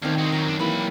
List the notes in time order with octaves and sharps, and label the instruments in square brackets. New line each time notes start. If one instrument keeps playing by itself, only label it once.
[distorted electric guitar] D2 [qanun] D#3 C4 F5
[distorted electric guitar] G#3 F#4
[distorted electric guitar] D#3 F#3 [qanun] A#5
[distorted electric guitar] F#2 D4
[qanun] E3 A#3 G4 [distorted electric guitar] F#3 B5